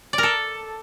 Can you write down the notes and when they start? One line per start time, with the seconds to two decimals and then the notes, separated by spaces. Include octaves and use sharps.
0.13 D5
0.18 A#4
0.23 A4